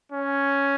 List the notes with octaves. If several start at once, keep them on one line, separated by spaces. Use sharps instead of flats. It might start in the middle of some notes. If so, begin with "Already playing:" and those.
C#4